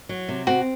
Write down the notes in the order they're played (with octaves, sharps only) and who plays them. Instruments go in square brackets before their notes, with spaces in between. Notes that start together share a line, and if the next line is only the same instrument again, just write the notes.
[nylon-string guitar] F#3
C3
[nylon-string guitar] C4 [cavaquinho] F#4